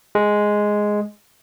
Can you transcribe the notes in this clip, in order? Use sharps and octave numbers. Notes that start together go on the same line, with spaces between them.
G#3